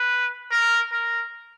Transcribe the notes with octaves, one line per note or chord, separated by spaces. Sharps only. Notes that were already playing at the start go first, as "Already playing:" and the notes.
Already playing: B4
A#4
A#4